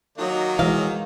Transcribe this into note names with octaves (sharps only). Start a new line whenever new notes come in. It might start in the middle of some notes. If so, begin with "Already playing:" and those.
D#3 F#3 A#3 D#4
E3 F3 G#3 F5